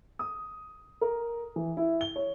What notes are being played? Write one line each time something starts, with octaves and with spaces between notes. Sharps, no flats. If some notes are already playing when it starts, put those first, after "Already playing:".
D#6
A#4
E3
E4
G7
C#5